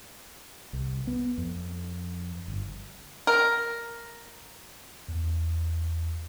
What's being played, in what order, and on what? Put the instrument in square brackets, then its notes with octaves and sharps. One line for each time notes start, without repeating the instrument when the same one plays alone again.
[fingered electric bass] C2
B3
F2
G1
[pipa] A#4
[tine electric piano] E2